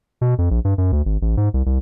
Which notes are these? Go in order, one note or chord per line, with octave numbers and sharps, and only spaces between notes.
B2
F2
A#1
G2
F#2
D2
G#1
A1
G#2
C2
C2